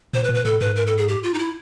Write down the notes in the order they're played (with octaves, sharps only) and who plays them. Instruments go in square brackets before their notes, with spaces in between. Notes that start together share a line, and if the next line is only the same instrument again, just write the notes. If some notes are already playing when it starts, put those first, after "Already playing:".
[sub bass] A#2 [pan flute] C5
[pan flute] B4
[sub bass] A#2
[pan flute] B4
[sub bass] A2 [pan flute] A4
[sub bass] G#2 [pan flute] B4
[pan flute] A#4
A4
G#4
G4
F4
D#4
E4